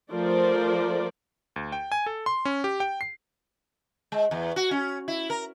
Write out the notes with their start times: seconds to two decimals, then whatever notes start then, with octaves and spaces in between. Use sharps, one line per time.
0.12 F3 A3 A#4 C5 D5
1.56 D2
1.72 G5
1.92 G#5
2.06 A4
2.26 C6
2.45 C#4
2.64 G4
2.80 G5
3.01 C7
4.12 G#3
4.31 E2
4.56 F#4
4.71 C#4
5.08 E4
5.30 A#4